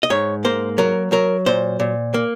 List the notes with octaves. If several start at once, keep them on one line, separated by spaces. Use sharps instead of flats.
D#5
G#2 C#5
A#3 C5
F#3 A#4
F#3 A#4
A#2 C5
A#2
A#3